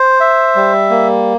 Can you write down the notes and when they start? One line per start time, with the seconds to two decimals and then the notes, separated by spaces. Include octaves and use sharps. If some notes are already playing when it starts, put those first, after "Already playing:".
Already playing: C5
0.20 E5
0.55 G3
0.90 A#3